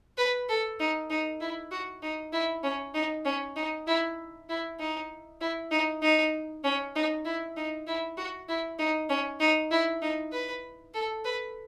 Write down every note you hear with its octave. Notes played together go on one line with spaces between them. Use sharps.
B4
A4
D#4
D#4
E4
F#4
D#4
E4
C#4
D#4
C#4
D#4
E4
E4
D#4
E4
D#4
D#4
C#4
D#4
E4
D#4
E4
F#4
E4
D#4
C#4
D#4
E4
D#4
B4
A4
B4